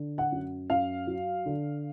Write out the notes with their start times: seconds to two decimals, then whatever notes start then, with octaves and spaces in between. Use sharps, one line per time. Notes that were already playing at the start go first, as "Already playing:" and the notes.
Already playing: D3
0.18 F#5
0.32 F#2
0.70 F#2 F5
1.07 F#3
1.46 D3